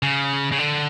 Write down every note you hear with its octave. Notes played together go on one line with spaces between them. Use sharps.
C#3
C#3
D3